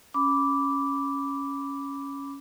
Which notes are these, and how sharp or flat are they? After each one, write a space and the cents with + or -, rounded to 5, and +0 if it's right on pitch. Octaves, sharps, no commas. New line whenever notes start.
C#4 +0 B5 +0 D6 -10